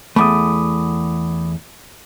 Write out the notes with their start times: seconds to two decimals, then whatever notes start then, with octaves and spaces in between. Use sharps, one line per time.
0.16 E2 A3 B5 D6 D#6